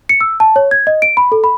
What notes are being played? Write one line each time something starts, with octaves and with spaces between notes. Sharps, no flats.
C#7
E6
A5
C#5
G#6
D#5
D7
B5
A4
B5